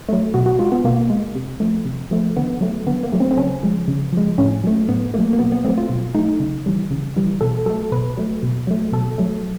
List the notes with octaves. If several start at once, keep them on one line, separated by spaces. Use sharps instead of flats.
F#3 A3
B2 F#4
F#4
G#3 F4
B3
B2 A#3
G#3
C3
F3 A3
C3
F3 A3
D3 B3
F#3 A3
D3 B3
A#3
F#3 A3
C4
C4
C#3 C#4
F3 G#3
C#3
F3 G#3
A2 C#4
F#3 A3
A2 B3
F#3 A3 A#3
A#3
B2 B3
B3
F#3 A3 C4
F4
B2
F#3 A3 D#4
C#3
E3 G3
C#3
E3 G3
B2 A4
F#3 A3 A4
B2 B4
F#3 A3
B2
F#3 A3
B2 A4
F#3 A3